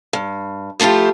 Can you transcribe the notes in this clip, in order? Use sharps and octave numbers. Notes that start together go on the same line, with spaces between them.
G2
F3 A3 E4 F4 G4